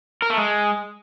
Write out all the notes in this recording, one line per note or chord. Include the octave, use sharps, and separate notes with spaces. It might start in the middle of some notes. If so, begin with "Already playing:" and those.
A#4
A3
G#3